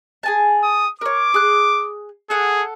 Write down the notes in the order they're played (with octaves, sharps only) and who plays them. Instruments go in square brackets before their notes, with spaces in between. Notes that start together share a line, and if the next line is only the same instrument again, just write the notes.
[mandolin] G#4 G#5 A5
[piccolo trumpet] D#6
[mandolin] A#4 C#5 [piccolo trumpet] D6
[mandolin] G#4 F#6
[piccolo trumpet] G#4 [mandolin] A4 F#5